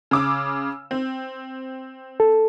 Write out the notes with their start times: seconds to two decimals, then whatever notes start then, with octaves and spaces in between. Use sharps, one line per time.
0.11 C#3 D6 E6
0.91 C4
2.20 A4